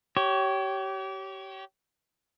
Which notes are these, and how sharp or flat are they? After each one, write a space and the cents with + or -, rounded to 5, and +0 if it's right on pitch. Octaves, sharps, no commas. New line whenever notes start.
G4 -30 C#5 +5